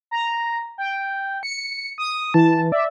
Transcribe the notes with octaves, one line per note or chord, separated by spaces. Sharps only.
A#5
G5
C#7
D#6
E3 A5
D5 E5